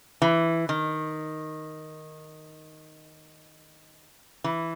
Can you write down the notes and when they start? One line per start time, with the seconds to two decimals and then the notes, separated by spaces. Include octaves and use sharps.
0.22 E3
0.69 D#3
4.44 E3